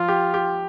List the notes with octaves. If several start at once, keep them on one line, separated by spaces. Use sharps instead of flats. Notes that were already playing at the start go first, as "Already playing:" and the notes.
Already playing: F3 F4
G4
G4